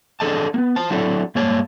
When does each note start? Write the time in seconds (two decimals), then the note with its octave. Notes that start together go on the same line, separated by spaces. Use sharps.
0.20 D4 G#4 A4 D#5 A5
0.54 A#3 B3
0.76 C5 A5
0.90 F#3 D4 E4 F#4 A4
1.35 G2 G#3 A#3 C#5 A5